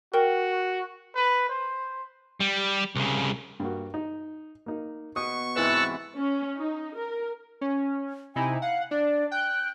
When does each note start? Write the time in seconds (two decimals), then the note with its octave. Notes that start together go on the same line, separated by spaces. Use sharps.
0.14 F#4 A#4 G5
1.16 B4
1.49 C5
2.40 G3
2.96 C2 C#3
3.60 G2 A#3 F#4
3.94 D#4
4.66 A#3 D#4
5.16 B2 C#6 D#6
5.56 G#2 C3 E3 E4 B4 F#5 A5 E6
6.16 C#4
6.57 D#4
6.97 A#4
7.61 C#4
8.36 C3 D#4 E4 G#5
8.62 F5 F#5
8.91 D4 D5
9.31 G5 F#6